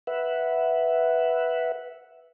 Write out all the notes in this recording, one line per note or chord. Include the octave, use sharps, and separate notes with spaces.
B4 E5 F#5